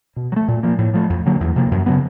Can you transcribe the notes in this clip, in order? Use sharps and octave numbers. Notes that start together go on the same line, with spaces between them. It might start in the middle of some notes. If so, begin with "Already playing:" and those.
B2
F#3
A3
A#2
F3 A#3
A2
F3 A3
F2
D3 F#3 A#3
E2
C3 F3 A#3
F#2
C#3 F#3 B3